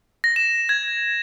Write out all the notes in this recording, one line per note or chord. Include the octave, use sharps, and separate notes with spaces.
A#6
E7
G#6